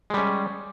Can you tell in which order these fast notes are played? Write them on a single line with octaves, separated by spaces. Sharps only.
G#3 G3 C#4